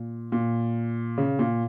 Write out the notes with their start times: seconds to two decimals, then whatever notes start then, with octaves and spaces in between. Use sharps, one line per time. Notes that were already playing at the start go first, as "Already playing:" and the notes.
Already playing: A#2
0.32 A#2
1.18 C#3
1.39 A#2